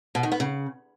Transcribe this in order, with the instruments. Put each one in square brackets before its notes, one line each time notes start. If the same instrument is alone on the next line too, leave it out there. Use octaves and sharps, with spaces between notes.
[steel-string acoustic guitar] B2
D#3
B3
C#3